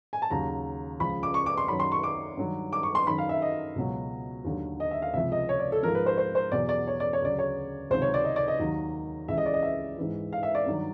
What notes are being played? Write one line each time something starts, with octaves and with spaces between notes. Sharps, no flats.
G#5
A5
D#2 C#3 F#3 A#5
C#2 C#3 F3 B5
D6
C#6
D6
C6
F#2 D#3 F#3 B5
C6
C#6
D6
G2 D#3 F#3
D6
C#6
C6
F#2 D#3 F#3 B5
F5
E5
D#5
C#2 B2 F#3
D#2 D3 F#3
D#5
E5
F5
C#2 C3 F3 E5
D#5
C#5
D5
A4
G#2 F3 A#4
B4
C5
C5
C5
E2 B2 F#3 D5
D5
C#5
D5
C#5
D2 C#3 F#3 D5
C#5
C#2 C3 D#3 F#3 C5
C#5
D5
D#5
D5
D#5
D#2 D#3 F#3
C#2 C#3 E3 E5
D#5
D5
D#5
E5
G#2 E3
F5
E5
D5
G2 D#3 F#3